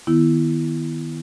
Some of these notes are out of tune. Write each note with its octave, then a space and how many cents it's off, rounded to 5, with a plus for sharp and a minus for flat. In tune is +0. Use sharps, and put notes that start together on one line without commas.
D#3 +0 B3 +0 E4 +10